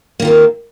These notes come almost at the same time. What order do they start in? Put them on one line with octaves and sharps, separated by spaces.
A#3 D#3 F4 C4